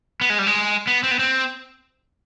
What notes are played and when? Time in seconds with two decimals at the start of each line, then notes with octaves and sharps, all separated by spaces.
0.21 B3
0.30 G#3
0.39 G3
0.47 G#3
0.87 B3
1.04 C4
1.11 B3
1.19 C4